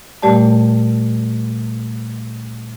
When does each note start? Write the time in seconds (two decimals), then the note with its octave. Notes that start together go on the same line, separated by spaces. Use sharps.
0.22 A#2 G3 A3 G4 D5 A5